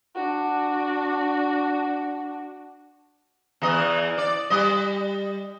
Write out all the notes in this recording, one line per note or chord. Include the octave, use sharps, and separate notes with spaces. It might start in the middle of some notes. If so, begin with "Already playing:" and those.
D4 F#4
E2 E3 D#5
D5
G3 D#5